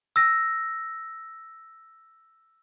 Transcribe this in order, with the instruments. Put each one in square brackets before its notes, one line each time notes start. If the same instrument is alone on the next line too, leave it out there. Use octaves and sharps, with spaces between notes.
[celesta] E6 A#6